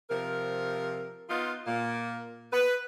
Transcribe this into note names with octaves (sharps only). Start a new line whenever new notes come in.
C3 F3 A#4
B3 D#4 F4
A#2 A#3
B4